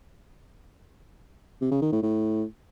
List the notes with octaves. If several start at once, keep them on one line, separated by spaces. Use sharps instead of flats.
C3
C#3
D#3
A2
A2